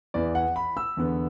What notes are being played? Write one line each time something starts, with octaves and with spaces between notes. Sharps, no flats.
E2 E3 B3 D5
F#5
B5
E6
E2 D3 B3